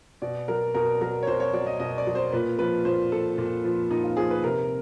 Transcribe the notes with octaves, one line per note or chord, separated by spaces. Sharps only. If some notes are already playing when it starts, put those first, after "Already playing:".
B2 D5
F#3 A#4
B2 A#4
F#3 A#4
C#5
B2 C5
C#5
F#3 D5
D#5
B2 D#5
D5
F#3
C5
A#2 B4
F3 B4
A#2 C5
F3 A4
A#2
F3
A#2 D#4
F4
F3 G#4
B4
C3 A#4